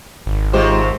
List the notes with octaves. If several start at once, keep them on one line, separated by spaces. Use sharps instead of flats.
G#1
C3 D#3 G#3 F4 G4 C5